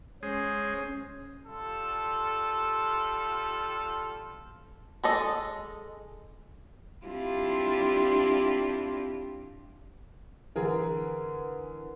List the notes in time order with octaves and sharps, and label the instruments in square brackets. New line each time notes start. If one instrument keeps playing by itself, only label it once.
[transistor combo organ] G#3 G#4 C5 [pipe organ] C#4
[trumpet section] G3 F4 A4
[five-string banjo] G#3 A4 D#5
[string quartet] G3 C4 D4 E4 F4 G4
[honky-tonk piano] D3 E3 G#4 A#4